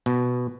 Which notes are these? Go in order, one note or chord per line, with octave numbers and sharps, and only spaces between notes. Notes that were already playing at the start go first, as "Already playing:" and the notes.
B2